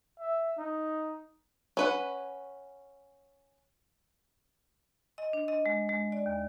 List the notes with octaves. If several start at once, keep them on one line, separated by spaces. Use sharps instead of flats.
E5
D#4
C#4 B4 F#5
D#5
D4
D#5
G#3
G#3
D5
D#2